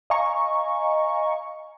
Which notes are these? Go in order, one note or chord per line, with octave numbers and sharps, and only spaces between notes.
D#5 F5 G#5 A#5 C#6